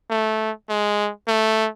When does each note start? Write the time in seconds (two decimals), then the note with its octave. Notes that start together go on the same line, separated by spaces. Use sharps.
0.10 A3
0.69 G#3
1.28 A3